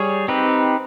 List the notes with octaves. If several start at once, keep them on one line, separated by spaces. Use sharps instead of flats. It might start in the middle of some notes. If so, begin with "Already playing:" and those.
Already playing: G3 G#4 C#5
C4 D#4 G4 B4